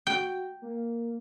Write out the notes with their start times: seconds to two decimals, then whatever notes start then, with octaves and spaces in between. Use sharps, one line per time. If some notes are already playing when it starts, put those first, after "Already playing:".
0.07 F#4 G5
0.62 A#3